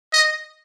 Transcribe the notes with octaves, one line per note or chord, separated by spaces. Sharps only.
D#5